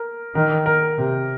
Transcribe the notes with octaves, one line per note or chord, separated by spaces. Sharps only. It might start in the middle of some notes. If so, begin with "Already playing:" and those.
Already playing: A#4
D#3 A#4
A#4
C3